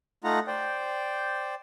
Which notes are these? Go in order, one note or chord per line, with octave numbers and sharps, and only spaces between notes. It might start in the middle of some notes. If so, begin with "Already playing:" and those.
A3 D#4 F4 F#5 A#5
C5 D5 G5